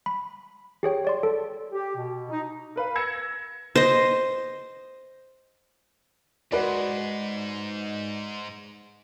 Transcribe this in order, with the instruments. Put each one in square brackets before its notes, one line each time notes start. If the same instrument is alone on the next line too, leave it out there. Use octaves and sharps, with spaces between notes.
[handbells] B5
G4 G#4 C#5 G5
C#5 D5 C6
A4
[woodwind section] G4
B2
D#4
[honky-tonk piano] A#4 B4 F5
E6 G#6 A#6 C#7 E7
[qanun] C5 D#5
[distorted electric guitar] G#2 [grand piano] F#4 B4 D5